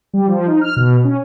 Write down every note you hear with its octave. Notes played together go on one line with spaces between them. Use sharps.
G3
F3
D#4
F6
B2
C#4